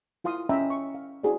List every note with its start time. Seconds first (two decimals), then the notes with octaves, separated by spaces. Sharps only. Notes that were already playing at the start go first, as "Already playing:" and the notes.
0.24 E4 F4 F5 C6 D#6
0.49 C#4 D#5 E5 G5 A#5 B5
0.70 C#6
0.95 F5
1.23 D4 E4 F#4 G#4 C5 D5